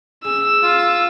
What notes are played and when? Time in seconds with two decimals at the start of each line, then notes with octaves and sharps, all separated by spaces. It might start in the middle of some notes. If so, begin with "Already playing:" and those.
0.24 C#4 G#4 E6
0.63 F4